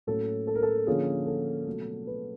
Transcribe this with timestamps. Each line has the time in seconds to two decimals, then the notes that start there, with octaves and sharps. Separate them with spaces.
0.07 A2 F#3 A#3 C#4 A4
0.47 A4
0.55 A#4
0.62 A4
0.87 D3 F3 A#3 C#4 F4 G#4
1.26 A4
1.66 B2 F#3 A3
2.07 B4